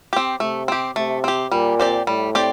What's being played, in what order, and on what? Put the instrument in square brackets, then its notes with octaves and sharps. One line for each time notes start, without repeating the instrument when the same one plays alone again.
[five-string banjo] C4 G4
[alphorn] C3 [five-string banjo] A3
[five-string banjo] C4 G4
[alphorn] C3 [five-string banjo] A3
[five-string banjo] C4 G4
[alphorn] A#2 [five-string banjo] G3
[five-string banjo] C4 G4 D5
[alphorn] A2 [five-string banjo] G3
[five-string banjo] C4 G4 D5